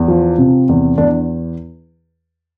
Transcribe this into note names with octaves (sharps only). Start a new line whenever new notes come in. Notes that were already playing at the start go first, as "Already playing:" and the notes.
Already playing: E2
F3
C3
E2
E2 D4